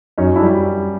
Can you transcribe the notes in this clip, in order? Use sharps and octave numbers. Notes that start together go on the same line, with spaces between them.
F#2 C#4 D#4
D4 E4
G3